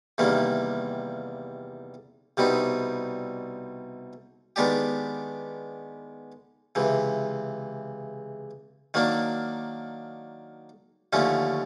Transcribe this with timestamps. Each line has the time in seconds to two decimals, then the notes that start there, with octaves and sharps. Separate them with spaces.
0.18 E2 C3 D#3 G3 A#3
2.37 C2 B2 G3 C4 D#4
4.56 D#3 G#3 B3 D4 G4
6.75 C#2 C3 E3
8.94 D#3 F#3 A#3 D4
11.13 D#2 D3 F3 A3 C#4